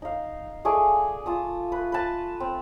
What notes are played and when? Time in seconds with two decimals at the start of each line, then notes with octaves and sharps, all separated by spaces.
0.02 D#4 F5
0.65 A3 G#4 D5
1.26 F4 A5 D#6
1.72 B4
1.92 B4 A5
2.40 C4